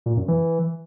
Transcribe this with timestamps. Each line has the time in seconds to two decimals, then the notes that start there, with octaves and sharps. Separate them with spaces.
0.06 A#2
0.17 F#2
0.28 E3